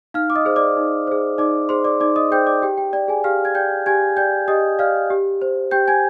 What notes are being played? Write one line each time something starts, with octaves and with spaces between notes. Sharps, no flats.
D#4 F5 F6
D6
D#5 D#6
G#4 C5
D5 D6
D#4
G#4 C5
D#4 D5 D6
G#4 C5 C6
D5 D6
D#4 D5 D6
D#5 D#6
G#4 C5 G5 G6
D5 D6
G4 G5
G5
D5 G5
G#4 G#5
G4 F5 F6
G#6
D5 G5 G6
G4 G#5 G#6
D5 G5 G6
G4 D#5 D#6
D5 F5 F6
G4
C5
G4 G5 G6
G#5 G#6